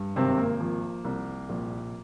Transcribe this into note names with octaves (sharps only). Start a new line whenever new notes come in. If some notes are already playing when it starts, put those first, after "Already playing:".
Already playing: G2
G#1 C3 C4
A#3
F3
C2
A#1